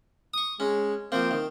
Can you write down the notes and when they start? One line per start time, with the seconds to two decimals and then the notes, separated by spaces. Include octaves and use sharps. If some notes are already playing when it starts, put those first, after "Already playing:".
0.34 C#6 D#6
0.60 G#3 C#4
1.12 F3 A#3 C4
1.31 D#3